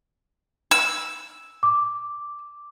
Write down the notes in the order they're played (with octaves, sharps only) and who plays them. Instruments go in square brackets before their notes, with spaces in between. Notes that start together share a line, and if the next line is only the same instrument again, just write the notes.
[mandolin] E6
[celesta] D6